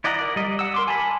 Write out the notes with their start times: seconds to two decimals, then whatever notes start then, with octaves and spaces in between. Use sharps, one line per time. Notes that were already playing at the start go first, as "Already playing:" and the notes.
0.04 E4 D5 D#5 F#5 A#5
0.19 A#4 D5
0.36 G3 D#5
0.59 F#5 E6
0.74 A#4 C6 D6
0.88 G#5 A5 B5